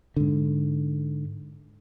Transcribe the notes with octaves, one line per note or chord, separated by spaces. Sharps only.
G#2 D3